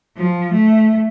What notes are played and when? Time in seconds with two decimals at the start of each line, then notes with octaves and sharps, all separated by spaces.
0.17 F3
0.53 A3